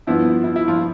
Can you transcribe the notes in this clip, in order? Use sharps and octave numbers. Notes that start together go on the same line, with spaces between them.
G2 F3 B3 E4
E4
E4
F3 F4